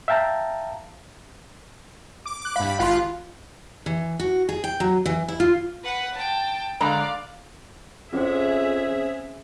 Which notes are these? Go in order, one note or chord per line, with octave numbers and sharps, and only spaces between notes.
E5 F5 G5 A5 A#5
D6
D6 F#6
G2 F5 B5
G#1 F4 F5 C6 F#6
E3
F#4
G#4
G5
F#3
E3
E4
F4
B4 F#5
G5 A5
D3 G#3 D5 F5 A#5
F2 C4 C#4 G#4 C5 E5